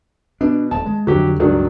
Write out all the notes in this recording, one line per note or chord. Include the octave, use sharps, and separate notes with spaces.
B2 D4
D#1 A5
G#3
F2 D3 F#3 G4
C#2 G2 D#3 F#3 D4